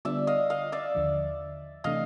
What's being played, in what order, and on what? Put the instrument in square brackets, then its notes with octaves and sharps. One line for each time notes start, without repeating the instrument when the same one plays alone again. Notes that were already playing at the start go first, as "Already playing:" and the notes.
[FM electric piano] D3 G3 B3 D4 F4 [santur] D5 E5
[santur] D#5 F5
D#5 F5
D5 E5
[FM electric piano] D#2 D3 F3
[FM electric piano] C3 E3 A3 D4 [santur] D#5 F5